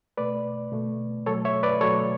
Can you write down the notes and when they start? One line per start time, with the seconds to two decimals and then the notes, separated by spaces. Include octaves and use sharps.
0.17 B2 A3 B4 D5
0.72 B2 A3
1.26 B2 F#3 A3 A4 C#5
1.45 C#5 E5
1.63 B4 D5
1.81 B2 F#3 A3 A4 C#5